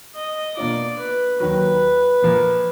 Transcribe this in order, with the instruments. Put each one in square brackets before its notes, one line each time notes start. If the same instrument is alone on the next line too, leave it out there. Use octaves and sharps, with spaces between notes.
[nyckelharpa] D#5
[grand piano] B2 A#3 D4 F4 [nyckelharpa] D5
[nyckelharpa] B4
[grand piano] D#2 D#3 F#3 [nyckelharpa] B4
[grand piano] A#2 F3 A#3